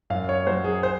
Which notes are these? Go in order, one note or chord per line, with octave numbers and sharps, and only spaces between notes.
F#2 F5
C#5
F#3 C5
G#4
C5